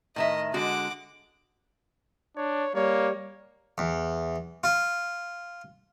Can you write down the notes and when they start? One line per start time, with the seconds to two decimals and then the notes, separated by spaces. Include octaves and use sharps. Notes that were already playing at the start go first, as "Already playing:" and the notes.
0.16 A2 D#3 D#5 E5
0.54 D3 G#3 F#4 F#5 D6
2.37 D4 C#5
2.75 G3 A#3 C#5
3.78 E2
4.64 F4